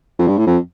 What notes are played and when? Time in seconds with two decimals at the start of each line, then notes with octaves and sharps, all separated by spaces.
0.19 F2
0.28 G2
0.38 A2
0.47 F2